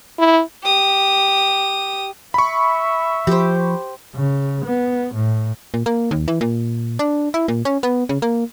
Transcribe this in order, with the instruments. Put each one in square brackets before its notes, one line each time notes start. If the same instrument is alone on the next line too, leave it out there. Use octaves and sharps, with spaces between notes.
[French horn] E4
[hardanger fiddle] G4 D#6
[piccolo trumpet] E5 [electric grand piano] B5 C#6
[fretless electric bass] F3 [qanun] G4 C5
[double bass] C#3
B3
A2
[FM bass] A#2
A#3
D#2
E3
A#2
D4
E4
A#2
C#4
B3
C#3
A#3